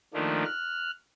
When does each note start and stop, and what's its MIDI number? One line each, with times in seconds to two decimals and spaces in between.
0.14 0.44 51
0.14 0.44 53
0.14 0.44 57
0.14 0.44 58
0.14 0.44 62
0.45 0.91 89
0.45 0.91 90